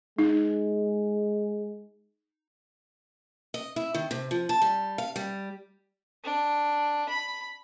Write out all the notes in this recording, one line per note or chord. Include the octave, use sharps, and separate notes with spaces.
G#3 D#4
D#5
E4
D#3
C3
F3
A5
G3
F5
G3
D4
B5